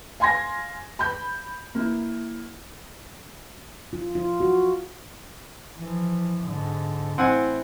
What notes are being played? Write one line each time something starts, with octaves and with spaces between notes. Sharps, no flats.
F5 G#5 C6 G#6 A#6
B5 G6
A#3 E4
F4
F4
F#4
E3 F3
G#2 D3
A1 C4 E4 F#5 G#5